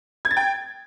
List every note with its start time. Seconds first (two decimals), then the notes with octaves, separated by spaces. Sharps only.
0.25 G#6
0.31 A6
0.37 G5